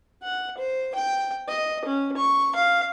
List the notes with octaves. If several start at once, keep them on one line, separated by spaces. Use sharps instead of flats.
F#5
C5
G5
D#5
C#4
C#6
F5